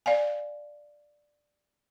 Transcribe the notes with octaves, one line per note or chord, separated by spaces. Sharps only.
D5 F5 G#5